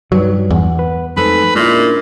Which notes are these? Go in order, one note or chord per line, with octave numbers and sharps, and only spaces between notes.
G2 F#3 D#4 B4 D5
E2 F#5
B4
F2 G#3 A3 D#4 A4 B4 C5
A#2 G#3 C#4 D4 E4 A#4